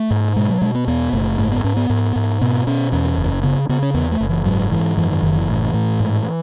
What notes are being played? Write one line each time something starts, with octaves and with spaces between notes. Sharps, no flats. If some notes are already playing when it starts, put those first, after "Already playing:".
Already playing: A3
G#2
B2 G#3
F#3
B2 G#3
B3
E2 B3
F#1 A3
G#2 A3
B3
G#2 C#4
B3
G#2
G#2
B2 B3
B2 C#4
E2 C#4
F#1
C#3 B3
C#3 B3
C#4
E2 B3
A3
F#1
E3
G#2 F#3
G#2 E3
F#2 E3
D#3
F#1 D#3
E3
A2
A2
G#2